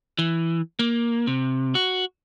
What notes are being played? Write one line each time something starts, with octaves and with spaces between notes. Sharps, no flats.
E3
A#3
C3
F#4